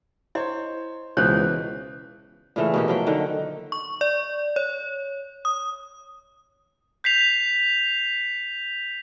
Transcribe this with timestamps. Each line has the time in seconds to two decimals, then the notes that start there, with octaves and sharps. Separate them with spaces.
0.35 E4 C5 C#5 D#5
1.17 C#2 B2 E3 C5 C#5
2.56 A#2 C#3 E3 A3
2.74 B2 A#3 G4
2.88 F3 F#3 G5
3.07 D3 D#3
3.72 C#6
4.01 D5
4.56 C#5
5.45 D#6
7.04 G6 B6 C7 F7